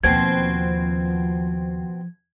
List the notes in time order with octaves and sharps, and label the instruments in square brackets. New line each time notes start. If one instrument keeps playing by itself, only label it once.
[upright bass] D#2 [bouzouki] B2 C4 [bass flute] F3 [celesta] G#6